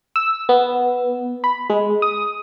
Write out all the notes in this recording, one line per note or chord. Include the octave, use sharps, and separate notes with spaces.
E6
B3
B5
G#3
D#6